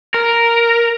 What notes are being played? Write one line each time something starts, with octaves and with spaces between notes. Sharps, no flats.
A#4